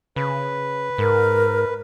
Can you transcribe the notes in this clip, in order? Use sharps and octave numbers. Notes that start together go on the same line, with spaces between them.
C#3 B4
G#2 A#4